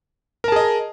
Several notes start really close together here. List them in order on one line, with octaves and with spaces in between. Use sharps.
A#4 A5 G#4 D#5